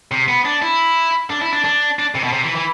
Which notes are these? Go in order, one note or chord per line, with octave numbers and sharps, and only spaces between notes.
C3
B3
D4
E4
D4
E4
D4
D4
D4
C3
B2
C3
E3
E3